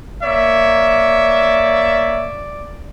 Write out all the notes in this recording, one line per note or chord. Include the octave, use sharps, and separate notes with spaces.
A#3 C#5 D5 E5